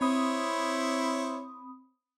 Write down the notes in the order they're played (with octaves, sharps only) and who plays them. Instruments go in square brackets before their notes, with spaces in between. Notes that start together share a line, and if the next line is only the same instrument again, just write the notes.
[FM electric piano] C4 B5 D#6 [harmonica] E4 C5 C#5